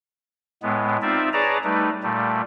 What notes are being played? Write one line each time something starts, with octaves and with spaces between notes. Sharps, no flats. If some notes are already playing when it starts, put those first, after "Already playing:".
A2 G#3 B3
C4 D#4 F4 D5 E5
G#4 B4 C#5 D5 A5 A#5
G3 A3 D#4 B4
A#2 G3 A3